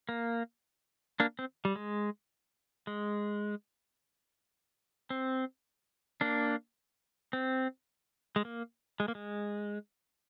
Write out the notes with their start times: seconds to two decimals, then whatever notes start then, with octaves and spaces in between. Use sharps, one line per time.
0.09 A#3
1.20 A#3 D4
1.39 C4
1.65 G3
1.76 G#3
2.87 G#3
5.10 C4
6.21 A#3 D4
7.33 C4
8.36 G#3
8.45 A#3
9.00 G#3
9.08 A#3
9.15 G#3